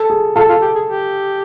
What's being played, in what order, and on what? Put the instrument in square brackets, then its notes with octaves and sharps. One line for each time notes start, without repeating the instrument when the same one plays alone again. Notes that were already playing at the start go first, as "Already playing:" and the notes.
Already playing: [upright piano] A4
G#4
[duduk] F4 [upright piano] A4
[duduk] F4
G4
G#4
G4